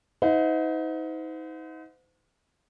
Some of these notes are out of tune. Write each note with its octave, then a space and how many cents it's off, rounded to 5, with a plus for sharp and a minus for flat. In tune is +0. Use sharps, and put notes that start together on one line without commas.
D#4 +35 C5 -40 F#5 -45